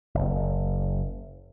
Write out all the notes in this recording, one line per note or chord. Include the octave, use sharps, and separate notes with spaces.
F#1